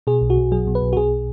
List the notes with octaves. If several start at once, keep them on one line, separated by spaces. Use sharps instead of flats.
B2 G#4
B1
F#4
B1
F#3 G#4
B2
B4
B1
F#4
B2 G#4